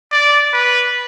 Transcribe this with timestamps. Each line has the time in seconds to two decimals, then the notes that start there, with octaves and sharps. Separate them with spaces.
0.11 D5
0.53 B4